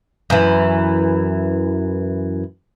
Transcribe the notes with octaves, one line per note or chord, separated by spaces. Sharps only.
F#2 E3